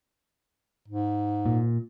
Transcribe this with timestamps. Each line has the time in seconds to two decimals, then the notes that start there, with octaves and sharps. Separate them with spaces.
0.88 G#2
1.46 A#2